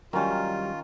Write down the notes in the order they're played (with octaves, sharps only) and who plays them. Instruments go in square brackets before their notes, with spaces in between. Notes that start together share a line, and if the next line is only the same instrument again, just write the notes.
[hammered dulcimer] D#3 C#4 [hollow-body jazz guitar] F#3 G3 [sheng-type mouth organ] F4